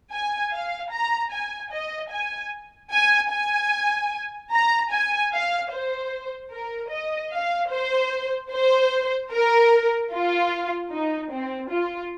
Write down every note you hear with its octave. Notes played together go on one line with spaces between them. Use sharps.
G#5
F5
A#5
G#5
D#5
G#5
G#5
G#5
A#5
G#5
F5
C5
A#4
D#5
F5
C5
C5
A#4
F4
D#4
C4
F4